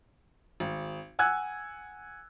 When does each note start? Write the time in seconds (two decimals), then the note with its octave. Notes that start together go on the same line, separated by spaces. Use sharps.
0.60 G#1
1.19 F#5 G#5 E6 F#6 G#6